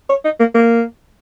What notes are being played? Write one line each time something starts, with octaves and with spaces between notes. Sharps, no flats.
C#5
D#4
A#3
A#3